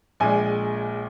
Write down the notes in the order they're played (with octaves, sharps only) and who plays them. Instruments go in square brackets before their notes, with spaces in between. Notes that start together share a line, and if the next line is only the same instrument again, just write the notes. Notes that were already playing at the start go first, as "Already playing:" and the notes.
[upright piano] A#1 A#2 G#3 G#5